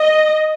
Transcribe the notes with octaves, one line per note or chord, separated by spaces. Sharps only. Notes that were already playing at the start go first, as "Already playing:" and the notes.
Already playing: D#5